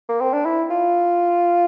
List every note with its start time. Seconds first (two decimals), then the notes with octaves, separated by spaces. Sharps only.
0.09 A#3
0.21 C4
0.33 D4
0.45 E4
0.70 F4